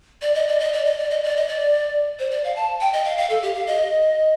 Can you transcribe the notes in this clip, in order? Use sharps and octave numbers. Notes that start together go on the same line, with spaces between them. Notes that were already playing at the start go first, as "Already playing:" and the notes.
D5
D#5
D5
D#5
D5
D#5
D5
D#5
D5
D#5
D5
C5
D5
F5
A5
G5
D#5
F5
F5
A4
G4
F5
D#5